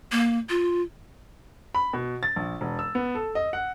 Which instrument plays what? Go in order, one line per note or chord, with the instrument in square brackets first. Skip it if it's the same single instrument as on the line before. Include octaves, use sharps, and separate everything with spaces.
[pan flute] A#3
F4
[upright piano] B5
B2
A6
A#1
E1
E6
B3
A4
D#5
F#5